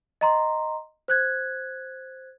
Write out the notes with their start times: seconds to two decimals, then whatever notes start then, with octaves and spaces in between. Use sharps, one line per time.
0.21 D#5 A#5 C6
1.08 C5 F#6 G#6